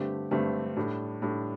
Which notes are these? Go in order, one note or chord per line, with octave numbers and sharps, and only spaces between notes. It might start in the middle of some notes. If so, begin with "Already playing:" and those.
Already playing: G2 D3 A3 C4 G4
G2 D3 A3 C4 G4
A2 G3 D4
A2 G3 D4